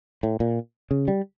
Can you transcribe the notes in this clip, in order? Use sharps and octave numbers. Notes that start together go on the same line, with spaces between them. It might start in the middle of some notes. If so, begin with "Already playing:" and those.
A2
A#2
C#3
G3